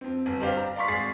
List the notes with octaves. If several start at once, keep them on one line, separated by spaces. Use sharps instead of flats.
F2 C4
G1
G2 D4 G4 C5 F5
A#5
D5 F5 C6 C#6 B6
G#1 G#4 A6 C7